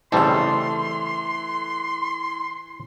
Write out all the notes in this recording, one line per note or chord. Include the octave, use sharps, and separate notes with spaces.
C#3 E3 G3 A3 C4 A4 C6